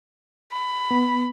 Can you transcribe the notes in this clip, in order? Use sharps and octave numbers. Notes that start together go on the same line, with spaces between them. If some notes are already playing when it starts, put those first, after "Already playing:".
B5
B3